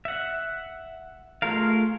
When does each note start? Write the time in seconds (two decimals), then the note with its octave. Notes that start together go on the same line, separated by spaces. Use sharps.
0.05 E5 F#5
1.42 A3 F4 G#4 A#4 F5